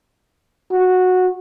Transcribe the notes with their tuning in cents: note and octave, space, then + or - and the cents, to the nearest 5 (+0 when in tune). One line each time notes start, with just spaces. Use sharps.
F#4 -10